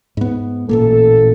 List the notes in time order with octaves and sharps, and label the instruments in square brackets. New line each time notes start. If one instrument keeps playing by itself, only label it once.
[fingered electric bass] G#2 B3
[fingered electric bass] A1 A#2 A#3 [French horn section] A4